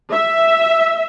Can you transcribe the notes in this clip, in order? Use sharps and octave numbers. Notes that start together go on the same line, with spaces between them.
E5